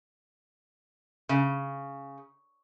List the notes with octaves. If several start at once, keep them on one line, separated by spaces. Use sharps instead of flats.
C#3